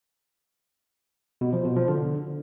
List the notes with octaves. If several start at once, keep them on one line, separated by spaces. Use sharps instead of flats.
B2
F3
B2
F3
D3